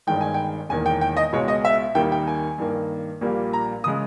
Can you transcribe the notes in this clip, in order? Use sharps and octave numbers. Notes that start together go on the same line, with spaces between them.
G1 G2 D#3 G#3 G5
G#5
G5
E1 E2 D#3 A#3 G#5
G5
G5
D#5
C#2 B2 G#3 C#5
D#5
E5
D#2 D#3 G3 A#3 G5
G5
G#5
G2 D#3 A#3
A#1 A#2 G3 A#3
A#5
C#3 G#3 D#6